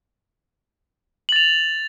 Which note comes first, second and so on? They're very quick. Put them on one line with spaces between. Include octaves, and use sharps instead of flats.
F#7 A6 F7